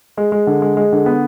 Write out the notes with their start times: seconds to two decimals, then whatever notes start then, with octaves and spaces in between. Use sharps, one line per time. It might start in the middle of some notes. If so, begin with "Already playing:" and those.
0.17 G#3
0.32 G#3
0.47 D3
0.62 G#3
0.77 G#3
0.92 D3
1.06 B3